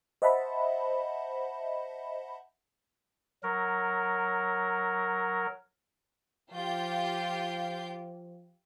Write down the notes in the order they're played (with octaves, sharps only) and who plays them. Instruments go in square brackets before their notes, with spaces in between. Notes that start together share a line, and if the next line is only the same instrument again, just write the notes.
[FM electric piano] C5 D#5 E5 F#5 A5 B5
[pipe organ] F#3 A#4
[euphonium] F3 [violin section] F4 G4 G6